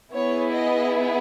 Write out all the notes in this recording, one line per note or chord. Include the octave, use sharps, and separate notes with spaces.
B3 E4 G#4 C#5
D#5